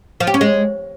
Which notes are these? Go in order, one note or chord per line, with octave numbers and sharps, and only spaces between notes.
F3
G4
C#4
G#3